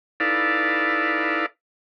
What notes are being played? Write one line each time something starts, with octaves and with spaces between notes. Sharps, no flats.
D#4 E4 A4 B4 D5 F5